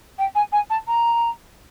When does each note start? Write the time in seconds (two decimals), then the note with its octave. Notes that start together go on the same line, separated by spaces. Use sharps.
0.18 G5
0.35 G#5
0.52 G#5
0.70 A5
0.87 A#5